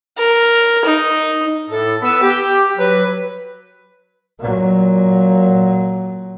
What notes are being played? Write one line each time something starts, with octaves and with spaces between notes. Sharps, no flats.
A#4
D#4
A2 A4
B3 B4 E6
G4
F#3 B4
A#2 F#3